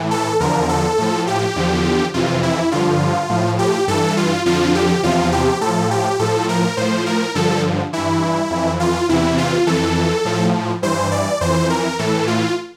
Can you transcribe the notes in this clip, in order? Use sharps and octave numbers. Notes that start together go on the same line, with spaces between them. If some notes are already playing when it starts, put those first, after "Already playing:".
Already playing: A2 E3
A4
E2 D3 F3 A#4
A4
A2 F3
G4
E2 D3 F3
F2 C3 E3 F4
E4
G2 D3 F3 F4
A2 F3
G4
G2 E3 A4
F4
F2 D3 F3 F4
G4
E2 C3 F3 F4
G4
A2 F3 A4
G4
A2 F3 A4
A#4
A2 F3 C5
A#4
G2 D3 F3 A4
G2 E3 E4
F2 E3
F4
E2 C3 E3 E4
F4
F2 E3 A4
A2 F3
G2 E3 C5
D5
F2 E3 C5
A#4
A2 E3 A4
F4